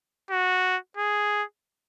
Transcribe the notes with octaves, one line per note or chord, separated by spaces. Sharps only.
F#4
G#4